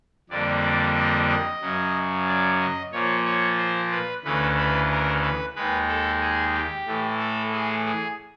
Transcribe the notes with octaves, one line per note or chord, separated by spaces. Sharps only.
F2 D3 G3 A#3 D5
D5
D#5
D#5
F#2 C#3 F#3
D5
D#5
A#2 F3 A#3 C#5
C#5
C5
B4
D2 C#3 E3 A3 B4
B4
A#4
B4
D#2 D#3 G#3 B4
A4
G#4
G4
A2 E3 A3
A4
G#4
G#4